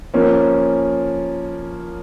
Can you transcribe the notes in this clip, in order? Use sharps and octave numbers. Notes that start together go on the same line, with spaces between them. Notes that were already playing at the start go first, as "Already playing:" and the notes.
F3 A#3 C#4